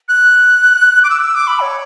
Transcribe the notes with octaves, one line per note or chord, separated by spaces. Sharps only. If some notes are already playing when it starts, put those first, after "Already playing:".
F#6
D6
E6
E6
D6
B5
C#5